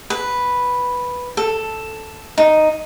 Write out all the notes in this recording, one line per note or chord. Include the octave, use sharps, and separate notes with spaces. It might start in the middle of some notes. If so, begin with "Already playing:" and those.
B4
A4
D#4